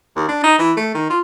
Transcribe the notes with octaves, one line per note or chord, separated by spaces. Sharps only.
D#2
D4
D#4
E3
A3
D#3
F4